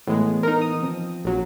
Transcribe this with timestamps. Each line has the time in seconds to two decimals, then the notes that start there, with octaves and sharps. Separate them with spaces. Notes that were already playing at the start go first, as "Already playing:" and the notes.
0.07 A2 E3 G#3 B3
0.43 D#4 A#4
0.62 D#6
0.82 F3 C4
1.24 A#1 F#3